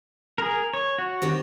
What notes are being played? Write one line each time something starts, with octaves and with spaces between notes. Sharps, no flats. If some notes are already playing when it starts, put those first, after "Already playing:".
G#4 A#4
C#5
F#4
D#3 C4 G4